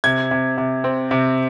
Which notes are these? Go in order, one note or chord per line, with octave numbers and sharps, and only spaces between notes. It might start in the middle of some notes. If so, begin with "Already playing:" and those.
C3 G#6
C3
C3
C4
C3